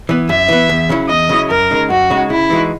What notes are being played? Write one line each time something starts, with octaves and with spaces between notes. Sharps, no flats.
E3 B3
F#2 E5
E3 B3
E2
C#3 F#3 C#4 E4
E2 D#5
C#3 F#3 C#4 E4
F#2 A#4
C#3 G#3 D#4
F#2 F#4
C#3 G#3 D#4
C#3 E4
E3 G#3 D#4 F#4